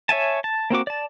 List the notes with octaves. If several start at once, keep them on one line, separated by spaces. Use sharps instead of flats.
C#5 E5 G#5 A5
A5
A#3 C4 F#4 D6
D5 A5